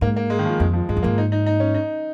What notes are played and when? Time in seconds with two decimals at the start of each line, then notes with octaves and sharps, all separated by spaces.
0.01 G#2 A#3
0.16 A#3
0.30 G#3
0.39 D#3
0.46 F3
0.60 F2 G#3
0.73 F3
0.89 G#2 G#3
0.97 F2
1.03 G#2 A#3
1.18 D#4
1.32 D#4
1.46 D#4
1.60 C#4
1.75 D#4